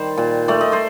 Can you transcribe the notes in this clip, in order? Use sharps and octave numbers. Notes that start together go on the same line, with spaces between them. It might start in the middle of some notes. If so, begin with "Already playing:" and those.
Already playing: D#3 G3 C5 D5
A#2
A3 D5
D#5
C5 D5